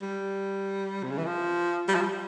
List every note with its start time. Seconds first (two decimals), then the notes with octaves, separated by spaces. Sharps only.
0.02 G3
1.03 C3
1.11 C#3
1.18 E3
1.26 F3
1.88 G3
1.95 F3
2.02 G3